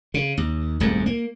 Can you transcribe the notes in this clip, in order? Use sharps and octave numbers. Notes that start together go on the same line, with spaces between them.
C#3
D#2
D#1 C2 G#2 A3
A#3